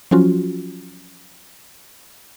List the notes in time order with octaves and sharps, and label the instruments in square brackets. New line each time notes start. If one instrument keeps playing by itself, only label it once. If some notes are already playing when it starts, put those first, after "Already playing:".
[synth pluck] F3 F#3 C#4 F4 F#4